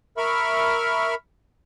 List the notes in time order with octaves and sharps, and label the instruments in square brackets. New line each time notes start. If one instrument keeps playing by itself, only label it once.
[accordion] A#4 E5 B5 C#6 F6